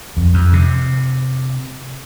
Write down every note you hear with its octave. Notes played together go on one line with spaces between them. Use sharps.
F2
F2
C3